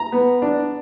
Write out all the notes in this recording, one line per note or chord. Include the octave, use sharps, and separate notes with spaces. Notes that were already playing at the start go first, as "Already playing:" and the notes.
Already playing: A#5
B3
D4